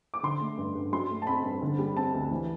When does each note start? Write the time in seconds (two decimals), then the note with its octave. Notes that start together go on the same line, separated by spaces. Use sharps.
0.14 D6
0.23 D3 C6
0.41 A3
0.58 G2
0.75 G2
0.93 F#3 C6
1.10 A3
1.22 A5
1.27 C4 B5
1.45 G2
1.62 D3
1.79 G3
1.96 C4 A5
2.14 D2
2.31 E3